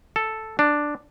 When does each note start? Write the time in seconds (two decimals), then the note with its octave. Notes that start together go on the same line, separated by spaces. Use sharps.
0.16 A4
0.59 D4